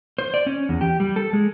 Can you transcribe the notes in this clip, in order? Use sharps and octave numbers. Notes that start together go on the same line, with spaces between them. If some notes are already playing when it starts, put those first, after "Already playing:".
C5
D5
C#4
E2
G4
G3
A4
G#3